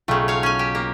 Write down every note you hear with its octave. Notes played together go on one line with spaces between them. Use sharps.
B1 C#3 A3 F4 G5
C#5 F5
C#4 G#5
G4
A#3